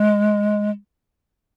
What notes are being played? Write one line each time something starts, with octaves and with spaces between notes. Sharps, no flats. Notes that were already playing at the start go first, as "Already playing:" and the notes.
Already playing: G#3